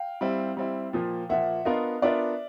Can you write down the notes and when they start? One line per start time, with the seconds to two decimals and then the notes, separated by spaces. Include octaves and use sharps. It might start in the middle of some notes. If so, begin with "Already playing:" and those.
Already playing: F5 G5
0.21 G3 C4 E4
0.57 G3 C4 E4
0.93 A#2 F3 A#3
1.29 A#2 F3 A#3 E5 F#5
1.65 B3 D4 F4 A#4 D#5 F5
2.02 B3 D4 F4 A#4 D5 E5